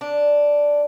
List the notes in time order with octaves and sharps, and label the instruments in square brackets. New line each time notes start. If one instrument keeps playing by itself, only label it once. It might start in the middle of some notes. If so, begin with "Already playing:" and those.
[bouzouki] D4